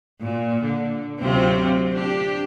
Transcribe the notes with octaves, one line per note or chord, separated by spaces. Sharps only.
A#2
D3
D2 C3 F#3 C4 F4
D4 G4